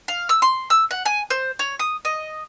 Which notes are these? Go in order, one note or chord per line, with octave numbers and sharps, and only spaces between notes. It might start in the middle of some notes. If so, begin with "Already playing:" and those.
F5
E6
C6
E6
F#5
G#5
C5
C#5
D#6
D#5